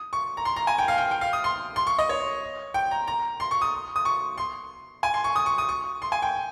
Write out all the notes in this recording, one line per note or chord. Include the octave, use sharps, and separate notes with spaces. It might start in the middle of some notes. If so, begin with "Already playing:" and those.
Already playing: D#6
C#6
A#5
C6
A#5
G#5
G5
F5
G5
G5
F5
D#6
C6
C6
C#6
D#5
C#5
G5
A#5
A#5
C6
C#6
D#6
D#6
C#6
C6
G#5
C6
C#6
D#6
C#6
D#6
C#6
C6
G#5
G5